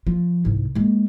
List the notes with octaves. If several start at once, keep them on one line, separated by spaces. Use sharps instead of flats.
F3
C2 G#2
G#3 A#3